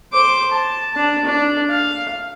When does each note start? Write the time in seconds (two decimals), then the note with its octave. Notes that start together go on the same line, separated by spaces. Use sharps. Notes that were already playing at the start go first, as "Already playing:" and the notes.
0.13 C5 D6
0.52 A5
0.94 D4 A5
1.25 D4
1.70 F5